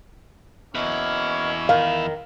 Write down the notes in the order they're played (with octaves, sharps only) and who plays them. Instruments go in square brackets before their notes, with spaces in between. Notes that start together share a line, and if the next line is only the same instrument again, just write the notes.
[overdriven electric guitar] E2 E4 [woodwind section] B2 A#3 C#4
[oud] D#3 [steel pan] F5